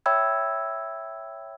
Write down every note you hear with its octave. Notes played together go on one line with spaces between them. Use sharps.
C#5 E5 G5 B5 E6 G#6